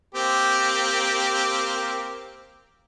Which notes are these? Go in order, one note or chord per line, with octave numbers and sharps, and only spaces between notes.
A#3 C4 G4